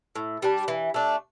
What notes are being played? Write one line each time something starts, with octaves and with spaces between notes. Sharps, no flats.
A2
G3 D4
E3
A3 D4